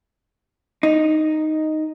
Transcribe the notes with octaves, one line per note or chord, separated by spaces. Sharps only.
D#4